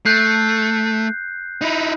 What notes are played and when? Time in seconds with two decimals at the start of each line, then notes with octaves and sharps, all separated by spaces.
0.06 A3 F#6 G6 C7
1.61 D#4 E4